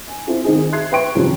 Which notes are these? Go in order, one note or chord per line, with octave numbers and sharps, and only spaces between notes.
G#5
C4 E4 F4 A4
D#3 C4 D#4 G#4
E5 C6 F#6 G#6 C7
B4 E5 G5 C6 C#6 D7
F#2 C3 D#3 F3 G3